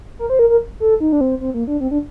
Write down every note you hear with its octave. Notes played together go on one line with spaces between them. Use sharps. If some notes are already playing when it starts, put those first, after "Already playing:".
A#4
C5
A#4
A#4
A4
D#4
D4
C4
C4
A#3
D4
C4
D4